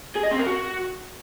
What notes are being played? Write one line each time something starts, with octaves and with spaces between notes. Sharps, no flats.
G#4
D#5
C4
A#4
F#4